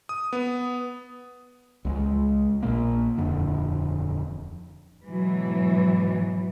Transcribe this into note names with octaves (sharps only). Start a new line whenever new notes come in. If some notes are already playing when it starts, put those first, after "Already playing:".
D#6
B3
C#2 G3 G#3
A#1 A#2 A#3
D#1 F2 D3
G#2 B2 E3 F#3